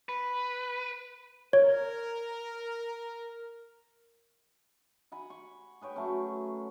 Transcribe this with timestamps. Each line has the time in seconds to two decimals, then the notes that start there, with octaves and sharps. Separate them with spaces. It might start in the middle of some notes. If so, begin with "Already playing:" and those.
0.09 B4
1.53 A#4 C#5
5.12 F#5 G#5 B5
5.30 C#6
5.81 G#4 B4 C#5 G5
5.96 F#3 A3 C#4